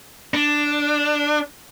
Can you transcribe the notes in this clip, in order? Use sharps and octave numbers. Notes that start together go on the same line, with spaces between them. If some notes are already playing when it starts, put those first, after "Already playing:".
D4